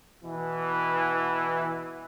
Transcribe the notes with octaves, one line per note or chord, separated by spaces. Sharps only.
B2 E3